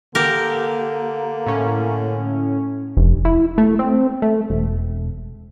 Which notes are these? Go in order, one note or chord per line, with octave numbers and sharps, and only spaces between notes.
D3 A#3 G4 A#4
A2 C#4
F1
E4
A3
C4
A3
E1